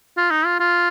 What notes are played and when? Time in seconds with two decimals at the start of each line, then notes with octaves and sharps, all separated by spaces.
0.17 F4
0.31 D#4
0.45 F4
0.60 F4